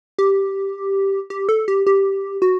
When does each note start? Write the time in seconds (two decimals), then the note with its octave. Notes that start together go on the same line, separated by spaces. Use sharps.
0.19 G4
1.30 G4
1.49 A4
1.68 G4
1.87 G4
2.42 F#4